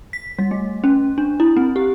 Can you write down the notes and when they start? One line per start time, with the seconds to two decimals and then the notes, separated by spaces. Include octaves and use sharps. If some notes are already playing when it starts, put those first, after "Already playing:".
0.13 B6
0.39 G3
0.51 A3
0.84 C#4
1.18 D4
1.40 E4
1.57 C4
1.76 G4